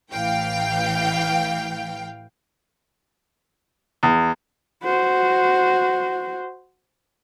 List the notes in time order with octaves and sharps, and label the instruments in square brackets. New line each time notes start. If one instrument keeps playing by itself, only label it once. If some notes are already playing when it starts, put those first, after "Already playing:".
[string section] A1 E3 F5 G5
[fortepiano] E2
[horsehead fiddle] F#4 C5